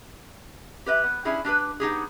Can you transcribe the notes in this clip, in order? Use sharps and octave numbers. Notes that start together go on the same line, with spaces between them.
G4 B4 D#5 E5
B3
C#4 D4 E4 G4 G#4
D4 G4 G#4 B4
B3 D#4 G4 G#4